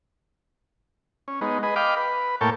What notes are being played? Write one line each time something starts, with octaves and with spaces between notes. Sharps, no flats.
C#4
G#3 B3 D#4
G#4 B4 D#5
D#5 F5 G5 B5 D6
B4
A2 A#3 C#5 G5 A5